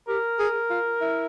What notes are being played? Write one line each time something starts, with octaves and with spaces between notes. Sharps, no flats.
G4 A#4
G#4
F4
E4